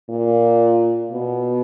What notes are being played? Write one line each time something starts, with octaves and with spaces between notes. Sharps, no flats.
A#2
B2